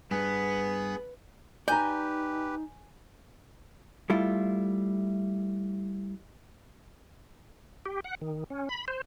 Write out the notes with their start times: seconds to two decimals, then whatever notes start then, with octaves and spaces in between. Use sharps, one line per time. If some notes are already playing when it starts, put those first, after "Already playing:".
0.11 G2 B3 G#4 B4
1.68 D#4 G4 B4 D5 G#5 A#5 G6
4.10 G3 A3 E4 F4
7.86 G4
8.04 F#5
8.21 D#3
8.50 C#4
8.69 B5
8.88 C5